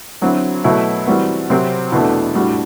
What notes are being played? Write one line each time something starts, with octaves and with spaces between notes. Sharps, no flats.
D3 F#3 C4 E4
B2 F#3 A3 E4
E3 G3 C4 F#4
C3 F#3 C4
E2 B2 A3 D4
A2 G3 D4 F#4